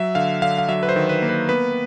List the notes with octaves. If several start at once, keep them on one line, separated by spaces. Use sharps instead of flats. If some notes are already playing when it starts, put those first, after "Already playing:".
Already playing: F#3 E5
D3 F5
D3 F5
F5
F#3 E5
B4
C5
D#3
B4
A#3
B4
B3 B4